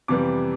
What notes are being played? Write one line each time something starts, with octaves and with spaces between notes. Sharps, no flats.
F2 C3 E3 G3 B3 D6